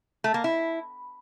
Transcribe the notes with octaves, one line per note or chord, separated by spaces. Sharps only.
A3
A#3
E4